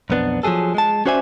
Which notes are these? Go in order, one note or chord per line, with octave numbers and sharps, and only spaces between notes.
B1 F2 B3 D4
F3 F#3 G#3 G#4 A4
G#3 A5
C#4 F#4 C5 D5 E5 G#5